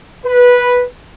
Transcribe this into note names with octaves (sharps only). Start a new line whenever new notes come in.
B4